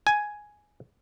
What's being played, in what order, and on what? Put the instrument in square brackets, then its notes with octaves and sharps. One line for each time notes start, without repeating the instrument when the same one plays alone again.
[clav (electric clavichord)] G#5